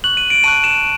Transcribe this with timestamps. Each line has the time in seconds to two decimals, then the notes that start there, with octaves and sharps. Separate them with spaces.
0.04 C#6 F#6 F#7
0.17 D#7
0.30 D7
0.44 A5 C#6 F#6 D#7
0.64 E7